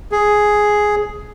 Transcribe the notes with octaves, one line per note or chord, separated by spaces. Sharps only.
G#4